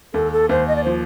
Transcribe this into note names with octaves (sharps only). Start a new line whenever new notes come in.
D#2 A4
A4
D#2 C5
D#5
D5
F3 C5